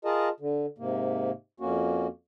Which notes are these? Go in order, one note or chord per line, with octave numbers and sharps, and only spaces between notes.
F4 G#4 A#4 D#5 A5
D3
G#2 C3 A#3
F2 A#3 C#4 F#4